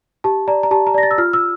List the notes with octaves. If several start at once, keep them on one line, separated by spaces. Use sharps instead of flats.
G4 A5
D5 A#5
A#5
G4 A5
A#5
D5 A#6
A6
E6
F4 F6
E6